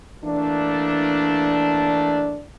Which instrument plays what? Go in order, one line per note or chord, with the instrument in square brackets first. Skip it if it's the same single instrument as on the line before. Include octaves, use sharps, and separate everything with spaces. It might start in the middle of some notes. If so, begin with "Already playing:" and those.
[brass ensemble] E3 A3 A#3 D4